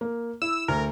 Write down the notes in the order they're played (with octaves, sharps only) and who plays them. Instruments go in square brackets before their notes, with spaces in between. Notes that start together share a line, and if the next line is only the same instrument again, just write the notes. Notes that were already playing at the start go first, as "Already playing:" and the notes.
[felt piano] A#3
[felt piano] E4 [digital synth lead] E6
[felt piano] D2 [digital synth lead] A#4